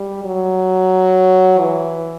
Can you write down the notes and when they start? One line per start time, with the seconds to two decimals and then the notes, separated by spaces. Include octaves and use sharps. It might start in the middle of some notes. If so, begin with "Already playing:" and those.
Already playing: G3
0.24 F#3
1.60 E3